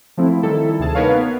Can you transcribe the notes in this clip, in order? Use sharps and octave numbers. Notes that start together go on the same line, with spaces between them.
F3 A3 C4 E4
D#3 G3 E4 A4
D2 C3 G#4 A5
B3 D#4 A#4 B4 C#5 F5
B3